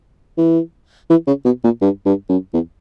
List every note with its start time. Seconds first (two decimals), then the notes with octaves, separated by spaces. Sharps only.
0.37 E3
1.10 E3
1.27 C#3
1.45 B2
1.64 A#2
1.82 G2
2.06 G2
2.29 F#2
2.54 E2